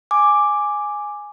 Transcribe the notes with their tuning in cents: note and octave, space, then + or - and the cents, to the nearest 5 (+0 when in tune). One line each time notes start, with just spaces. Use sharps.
G#5 +0 D6 +5